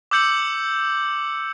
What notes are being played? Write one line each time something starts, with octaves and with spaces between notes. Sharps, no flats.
D6 E6 G6 C#7 F#7